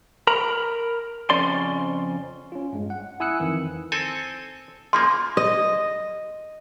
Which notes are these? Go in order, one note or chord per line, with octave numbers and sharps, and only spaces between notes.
A#4 A#5 B5
F2 C#3 F3 C#4 D5 C6
C#4 F4
G2 G#3
F#5
E4 G#5 D#6 E6 F#6 C#7
F2 D#3 E3
C4 A4 G#5
C#3 F3 A#3 C6
D#5